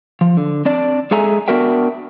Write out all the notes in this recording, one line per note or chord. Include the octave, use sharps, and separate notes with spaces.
F3
D3
C4 D4 D5
G#3 G#4 A4 E5 G#5 A#5
B3 D4 F#4 A#4 E5 G5